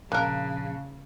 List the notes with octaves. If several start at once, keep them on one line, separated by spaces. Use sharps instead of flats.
A#1 C#3 A#3 A#4 F5 A5 F#6